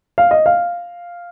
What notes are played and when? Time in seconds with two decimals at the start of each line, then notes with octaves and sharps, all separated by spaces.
0.18 F5
0.31 D#5
0.46 F5